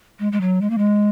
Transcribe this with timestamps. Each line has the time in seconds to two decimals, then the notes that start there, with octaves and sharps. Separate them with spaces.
0.19 G#3
0.32 G#3
0.41 F#3
0.61 G#3
0.70 A#3
0.78 G#3